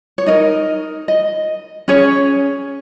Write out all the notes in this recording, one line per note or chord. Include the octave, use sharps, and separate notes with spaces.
C#5
D#4 A#4 D#5
D#5
C#4 G#4 C#5